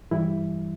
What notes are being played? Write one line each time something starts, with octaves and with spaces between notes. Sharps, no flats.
G2 E3 G3 E4